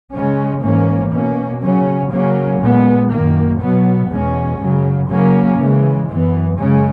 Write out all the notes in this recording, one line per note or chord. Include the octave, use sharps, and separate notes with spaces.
C#3 G#3 C#4
G#2 E3 A#3 C#4
B2 A#3 C#4
C#3 F#3 C#4
C#3 F#3 A#3 C#4
A#2 G#3 B3
F#2 D#3 A#3
B2 F#3 B3
E2 B2 G#3 C#4
F#2 C#3 F#3
C#3 F#3 A#3 C#4
C#3 E3 G#3
F#2 E3 B3
F#2 C#3 G#3 C#4